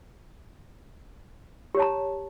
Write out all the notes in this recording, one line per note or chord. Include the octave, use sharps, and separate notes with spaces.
G4 C#5 A5 A#5